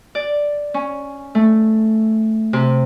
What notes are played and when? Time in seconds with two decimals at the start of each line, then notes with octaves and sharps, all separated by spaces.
0.15 D5
0.74 C#4
1.35 A3
2.53 C3